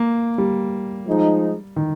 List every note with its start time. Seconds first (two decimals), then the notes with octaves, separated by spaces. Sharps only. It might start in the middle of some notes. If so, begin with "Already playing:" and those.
Already playing: A#3
0.38 G3
1.07 F3 G#3 D#4
1.76 D#3